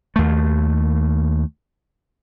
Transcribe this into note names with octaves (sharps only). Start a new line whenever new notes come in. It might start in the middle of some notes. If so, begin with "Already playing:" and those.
D#2 A3